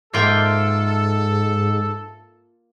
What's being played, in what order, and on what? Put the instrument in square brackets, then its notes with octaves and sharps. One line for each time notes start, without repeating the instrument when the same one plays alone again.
[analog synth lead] G#2 [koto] A#3 F4 G5 [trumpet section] A4 [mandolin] E5 C6 D6